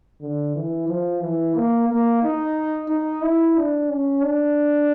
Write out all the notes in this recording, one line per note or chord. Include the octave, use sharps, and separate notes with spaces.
D3
E3
F3
E3
A#3
A#3
D#4
D#4
E4
D4
C#4
D4